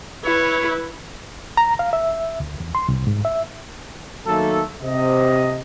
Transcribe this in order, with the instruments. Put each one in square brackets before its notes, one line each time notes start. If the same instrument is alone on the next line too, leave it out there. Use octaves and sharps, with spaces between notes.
[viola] E4 B4 [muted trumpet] C#5
[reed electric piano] A#5
F5
E5
D2
E2
C6
C2
G#2
E5
[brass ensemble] D#3 F#3 A3 A#3 A4
C3 D#5